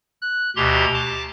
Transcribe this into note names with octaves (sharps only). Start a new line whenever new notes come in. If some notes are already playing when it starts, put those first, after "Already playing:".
F#6
D2 B2 G4 A#5 C6 G#6
A5 D6